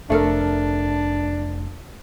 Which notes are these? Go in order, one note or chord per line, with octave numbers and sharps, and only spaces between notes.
F1 A3 D4 A4 A#4